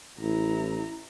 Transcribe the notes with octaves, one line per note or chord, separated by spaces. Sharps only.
A1 E4 A#5